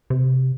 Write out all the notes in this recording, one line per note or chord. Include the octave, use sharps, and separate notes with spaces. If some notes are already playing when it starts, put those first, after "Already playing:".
C3